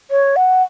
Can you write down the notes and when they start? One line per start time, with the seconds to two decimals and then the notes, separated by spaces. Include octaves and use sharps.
0.11 C#5
0.36 F#5